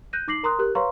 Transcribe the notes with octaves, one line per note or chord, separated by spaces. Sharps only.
F#6 G6 A#6 D#7
D#4 D6 A#6 C7 F#7
A#4 A#5 C6 D#6 F#6
G4 A#4 F#6
B4 C#5 F5 A#5 C6 C#6